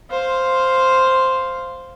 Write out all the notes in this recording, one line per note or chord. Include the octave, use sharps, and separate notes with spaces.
C5 F5